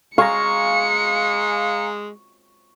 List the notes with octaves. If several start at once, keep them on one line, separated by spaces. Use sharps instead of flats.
G#3 F5 G#5 A#5 C#6 C#7